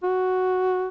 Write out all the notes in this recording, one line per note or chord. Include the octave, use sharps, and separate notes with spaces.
F#4